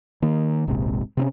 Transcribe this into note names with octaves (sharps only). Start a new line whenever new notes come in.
D#3 A#3
D1 A#1 G#2 C3
C3 C4 C#4